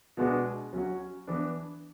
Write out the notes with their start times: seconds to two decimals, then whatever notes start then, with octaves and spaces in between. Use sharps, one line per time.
0.17 B2 G#3 B3 D4 F#4
0.73 F#3 C#4 F#4
1.27 E3 B3 D4